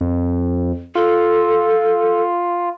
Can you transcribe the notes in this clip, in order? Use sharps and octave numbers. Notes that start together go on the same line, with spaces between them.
F2
F4 A4